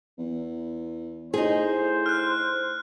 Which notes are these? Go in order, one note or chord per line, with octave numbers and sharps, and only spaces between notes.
E2
A2 D#4 G#4 C5
F6 F#6